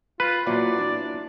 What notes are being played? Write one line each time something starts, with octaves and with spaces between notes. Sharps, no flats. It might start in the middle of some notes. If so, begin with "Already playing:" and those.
F4 B4
A#2 E3 F#3 D5
D4